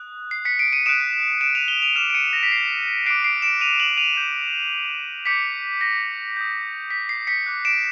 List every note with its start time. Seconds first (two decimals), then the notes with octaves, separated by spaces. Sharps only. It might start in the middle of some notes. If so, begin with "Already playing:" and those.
Already playing: D#6 F#6
0.31 C7
0.45 B6 C#7
0.59 C7 D7
0.72 C#7 D#7
0.86 D#6 F#6 D7 E7
1.41 D7 E7
1.55 D#7 F7
1.68 F7 G7
1.82 D#7 F7
1.96 D6 F6 D7 E7
2.10 D7
2.15 C#7 D#7
2.33 A#6
2.43 B6
2.52 C7
3.06 D6 F#6 C7 D7
3.24 C7 D7
3.42 D7 E7
3.61 D#7 F7
3.80 E7 F#7
3.97 D#7 F7
4.16 D6 G6
5.26 D6 G6 B6 C#7
5.81 A#6
6.36 D#6 G6
6.90 B6
7.09 C7
7.27 B6 C#7
7.46 D6 F#6
7.65 D7 E7